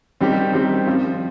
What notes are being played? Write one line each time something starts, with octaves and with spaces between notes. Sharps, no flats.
D#3 G3 C4 D#4 G4
D#3 G3 C4 D#4 G4
F3 C4 F4